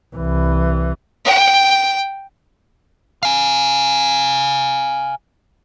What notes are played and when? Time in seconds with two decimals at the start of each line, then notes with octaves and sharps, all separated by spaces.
0.16 C2 E3
1.25 G5
3.23 F5 G#5